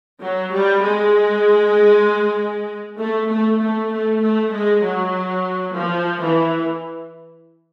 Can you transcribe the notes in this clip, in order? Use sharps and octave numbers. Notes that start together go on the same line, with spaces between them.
F#3
G3
G#3
A3
A3
A3
A3
A3
G#3
F#3
F3
E3